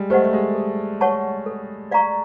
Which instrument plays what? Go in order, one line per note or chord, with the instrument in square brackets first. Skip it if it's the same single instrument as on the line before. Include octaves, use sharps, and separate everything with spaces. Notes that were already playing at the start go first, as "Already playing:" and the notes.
Already playing: [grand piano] G3 G#3
[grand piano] A3 [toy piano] G4 C5 D#5 F#5
[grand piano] A3
G#3
[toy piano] A4
C#5 F#5 A5 C#6
A4
D5 F5 A#5 C#6